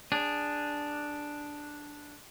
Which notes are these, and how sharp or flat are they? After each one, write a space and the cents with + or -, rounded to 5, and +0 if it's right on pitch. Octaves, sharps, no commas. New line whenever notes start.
D4 +0 G#4 -15